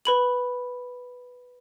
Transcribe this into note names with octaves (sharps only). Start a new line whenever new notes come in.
B4 B5 F#7